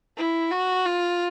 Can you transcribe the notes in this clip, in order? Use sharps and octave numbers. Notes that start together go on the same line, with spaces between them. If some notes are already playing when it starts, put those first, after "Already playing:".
E4
F#4
F4